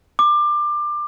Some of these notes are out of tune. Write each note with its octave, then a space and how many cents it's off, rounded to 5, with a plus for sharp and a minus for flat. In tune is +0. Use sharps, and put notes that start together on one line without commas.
D6 +20